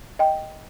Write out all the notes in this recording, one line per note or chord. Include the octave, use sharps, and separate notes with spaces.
D#5 G5